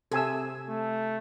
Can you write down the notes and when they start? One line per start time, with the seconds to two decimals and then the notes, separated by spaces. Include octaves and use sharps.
0.12 C3 A4 G#5 E6
0.69 A3